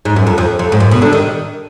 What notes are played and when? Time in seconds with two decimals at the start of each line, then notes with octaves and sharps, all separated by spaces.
0.05 G#2
0.16 F#2
0.27 F2
0.38 F2
0.59 F2
0.72 G#2
0.80 F#2
0.91 B2
1.02 D3
1.13 D#3